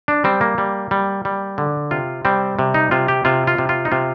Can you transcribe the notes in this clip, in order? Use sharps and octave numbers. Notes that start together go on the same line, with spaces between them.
D4
G3 C4
A#3
G3
G3
G3
D3
C3 F4
G3 C4
C3
D#4
C3 F4
G4
C3 F4
F4
C3
F4
D#4
C3 F4